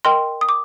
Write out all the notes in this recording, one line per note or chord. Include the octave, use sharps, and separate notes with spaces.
A#4 D#5 G5 C6
D#6
D6